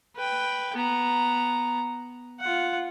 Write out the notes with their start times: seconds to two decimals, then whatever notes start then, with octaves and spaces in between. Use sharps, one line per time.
0.16 B4 G5
0.76 B3 A#5
2.40 F4 F#5